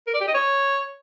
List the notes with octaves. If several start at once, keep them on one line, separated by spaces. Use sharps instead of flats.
A#4
D5
G4
D#5
C#5